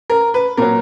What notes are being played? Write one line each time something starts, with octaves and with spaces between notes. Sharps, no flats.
A#4
B4
A#2 F#3 A#4